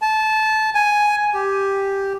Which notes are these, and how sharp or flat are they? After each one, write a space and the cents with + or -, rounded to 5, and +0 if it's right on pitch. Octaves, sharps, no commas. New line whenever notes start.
A5 -20
G#5 +5
G4 +0